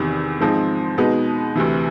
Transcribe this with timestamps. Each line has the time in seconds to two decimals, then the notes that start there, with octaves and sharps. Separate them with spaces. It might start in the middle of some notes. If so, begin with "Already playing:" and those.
Already playing: E2 C3 D#3
0.40 G#2 F3 G#3 C4 D#4
0.98 B2 G#3 B3 D#4
1.56 D2 C3 E3